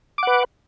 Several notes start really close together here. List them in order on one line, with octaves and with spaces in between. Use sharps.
D6 F#5 B4